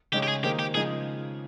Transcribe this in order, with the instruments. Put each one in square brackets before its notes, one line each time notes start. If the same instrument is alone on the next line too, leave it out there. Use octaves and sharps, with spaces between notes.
[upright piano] C#3 G#3 D#4 G#4 C#5 [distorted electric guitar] G4
[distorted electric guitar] G4
G#4
[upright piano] D#3 A#3 D#4 G#4 C5 [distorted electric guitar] G4
[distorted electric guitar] G4
[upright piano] C#3 F3 G#3 D#4 [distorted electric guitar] G#4